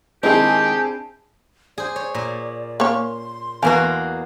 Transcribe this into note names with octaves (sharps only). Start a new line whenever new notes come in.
D#3 G#3 C4 D4 E4 G4 G#4
G#4 C5 D5
C#5
A#2 D5
A#3 C#4 C#5 C6
E2 A#3 F#4 B4 C5 F5 G#5